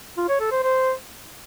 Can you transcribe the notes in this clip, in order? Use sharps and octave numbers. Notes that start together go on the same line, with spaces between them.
F4
C#5
A4
C5
C5